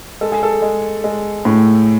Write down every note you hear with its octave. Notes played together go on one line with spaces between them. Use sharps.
G#3 A4
G#4
A4
G#3
G#3
A2